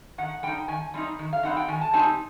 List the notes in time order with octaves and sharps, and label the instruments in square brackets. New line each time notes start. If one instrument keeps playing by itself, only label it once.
[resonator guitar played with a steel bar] D#3 F#5
G3 C4 D#4 G5
D#3 G#5
G3 C4 D#4
D#3
F5
G3 C4 D#4 F#5
G5
D#3 G#5
A5
G3 C4 D#4 G#5